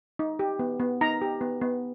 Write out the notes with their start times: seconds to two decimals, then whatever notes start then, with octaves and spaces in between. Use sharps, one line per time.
0.19 D#4
0.39 G4
0.59 B3
0.80 B3
1.01 D#4 A#5
1.22 G4
1.41 B3
1.61 B3